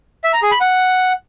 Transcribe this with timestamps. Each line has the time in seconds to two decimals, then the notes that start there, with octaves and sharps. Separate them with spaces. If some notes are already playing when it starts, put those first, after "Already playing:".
0.24 E5
0.33 A#5
0.42 G#4
0.51 B5
0.61 F#5